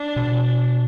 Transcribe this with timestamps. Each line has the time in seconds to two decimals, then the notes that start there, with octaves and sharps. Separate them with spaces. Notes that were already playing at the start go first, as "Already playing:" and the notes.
Already playing: D4
0.16 B2